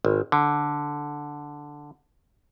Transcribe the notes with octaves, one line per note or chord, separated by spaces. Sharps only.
G#1
D3